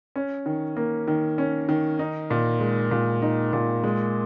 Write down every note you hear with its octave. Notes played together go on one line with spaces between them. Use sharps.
C#4
D#3
A#3
D#3
C#4
D#3
D#4
A#2
G#3
A#2
D#4
A#2
G#3